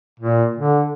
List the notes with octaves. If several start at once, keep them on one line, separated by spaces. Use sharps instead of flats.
A#2
D3